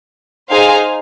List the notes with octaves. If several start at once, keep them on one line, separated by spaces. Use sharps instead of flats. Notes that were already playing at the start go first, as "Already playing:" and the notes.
D#4 G#4 C5 F5 G#5